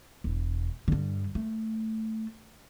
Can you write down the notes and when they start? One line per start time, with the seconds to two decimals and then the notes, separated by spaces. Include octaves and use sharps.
0.24 E1
0.88 G2 D3
1.35 A3